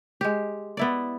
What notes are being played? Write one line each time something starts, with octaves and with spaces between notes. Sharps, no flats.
G#3 G4
B3 E4 D5